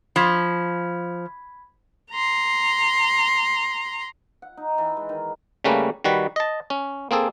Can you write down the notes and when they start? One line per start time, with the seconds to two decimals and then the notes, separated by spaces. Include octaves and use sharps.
0.16 F3 B5 G#6 B6
2.11 A#5 C6
4.42 F#5
4.57 D#4
4.78 E3
4.97 G#3
5.09 D#3
5.64 C#3 G3 A3 A#3 C#4 B4
6.04 D#3 G3 F#4 B4
6.36 D#5 A5
6.70 C#4
7.11 A#3 C4 G#4 A4